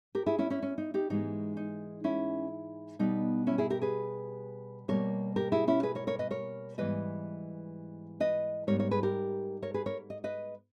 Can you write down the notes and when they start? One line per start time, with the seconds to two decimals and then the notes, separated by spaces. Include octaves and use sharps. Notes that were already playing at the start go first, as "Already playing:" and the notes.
0.15 G4 A#4
0.26 E4 G#4
0.38 C#4 E4
0.50 C#4 E4
0.62 C#4
0.78 D#4
0.94 D#4 G4
1.10 G#2 E3 G#3 B3 D#4
1.57 D#4
2.04 C#4 E4
2.99 B2 G3 B3 D#4
3.47 C#4 E4
3.58 E4 G#4
3.70 G4 A#4
3.82 G#4 B4
4.88 B2 G3 A#3 A#4 C#5
5.36 G4 A#4
5.52 E4 G#4
5.68 C#4 E4
5.83 G#4 B4
5.95 A#4 C#5
6.07 A#4 C#5
6.19 B4 D#5
6.31 A#4 C#5
6.78 G#2 E3 G3 B3 B4 D#5
8.20 B4 D#5
8.67 G#2 G3 B3 A#4 C#5
8.79 A#4 C#5
8.91 G#4 B4
9.03 G4 A#4
9.62 A#4 C#5
9.74 G#4 B4
9.86 A#4 C#5
10.10 D#5
10.24 B4 D#5